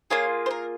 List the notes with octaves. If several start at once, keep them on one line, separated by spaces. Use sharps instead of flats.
A#3 F4 G#4 C#5
C5
A#4